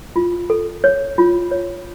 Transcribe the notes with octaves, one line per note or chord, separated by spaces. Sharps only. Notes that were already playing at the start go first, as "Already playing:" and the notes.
F4
A4
C#5
F4
C#5